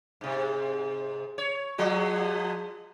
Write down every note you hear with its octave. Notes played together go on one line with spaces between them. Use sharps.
G#2 C3
C#5
F3 G#3 F#4